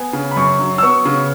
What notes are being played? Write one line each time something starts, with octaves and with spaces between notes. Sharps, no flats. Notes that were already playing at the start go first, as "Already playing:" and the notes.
Already playing: B3 G#5
C#3
B5
F#2 C#6
F#3
E6
B3 C#6
C#3